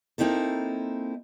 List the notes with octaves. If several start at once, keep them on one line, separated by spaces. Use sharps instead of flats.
A#3 C4 D#4 E4 A4